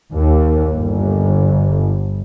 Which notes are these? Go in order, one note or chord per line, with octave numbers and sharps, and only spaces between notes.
D#2
G1